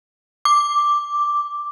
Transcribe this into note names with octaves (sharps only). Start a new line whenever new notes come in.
D6